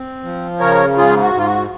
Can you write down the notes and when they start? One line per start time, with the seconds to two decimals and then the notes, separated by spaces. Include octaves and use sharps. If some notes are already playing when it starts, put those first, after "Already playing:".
Already playing: C4
0.24 F3
0.60 C#3 A#4 C#5
0.97 G#2 F4 G#4
1.21 F#4
1.34 G#2 F4
1.46 F#4